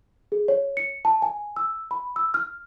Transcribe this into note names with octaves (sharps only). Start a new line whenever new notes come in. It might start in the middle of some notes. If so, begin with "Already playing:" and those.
G#4
C#5
C#7
A5
G#5
E6
B5
E6
F6